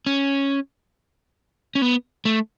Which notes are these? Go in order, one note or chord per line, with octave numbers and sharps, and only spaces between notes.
C#4
C#4
B3
A3